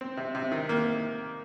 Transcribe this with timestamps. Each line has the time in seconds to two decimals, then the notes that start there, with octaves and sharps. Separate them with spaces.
0.01 C4
0.17 C3
0.35 C3
0.52 D#3
0.69 A#3